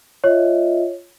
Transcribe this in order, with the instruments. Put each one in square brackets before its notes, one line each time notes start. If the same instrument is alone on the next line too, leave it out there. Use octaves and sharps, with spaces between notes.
[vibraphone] F4 D#5 E5 [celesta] C#5